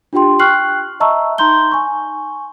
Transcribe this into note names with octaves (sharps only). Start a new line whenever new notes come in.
D4 F4 G4 G5 C6
G5 C#6 F6 F#6 C7 F#7
D#5 E5 A5 A#5 C#6 E6
D#4 A#5 C6 G6 G7
G#5 C#6